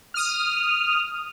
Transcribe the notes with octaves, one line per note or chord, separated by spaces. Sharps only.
D#6 F6